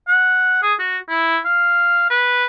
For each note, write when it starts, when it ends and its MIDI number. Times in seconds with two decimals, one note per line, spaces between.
0.08 0.58 78
0.63 0.74 68
0.79 0.98 66
1.08 1.39 64
1.45 2.08 77
2.10 2.46 71